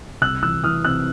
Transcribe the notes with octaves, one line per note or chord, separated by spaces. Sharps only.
C2 E6 F#6
E3 E6 F#6
E3 D#6 F6
C3 E6 F#6